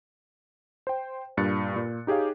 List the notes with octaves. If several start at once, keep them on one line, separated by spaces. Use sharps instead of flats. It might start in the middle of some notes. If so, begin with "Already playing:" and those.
C5 G5
G2 A#2 F#6 A6 C#7
A#2
D#4 G4 G#4 C#5 F5